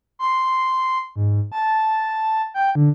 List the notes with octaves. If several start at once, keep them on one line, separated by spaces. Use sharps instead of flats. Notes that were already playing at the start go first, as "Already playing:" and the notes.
C6
G#2
A5
G5
D3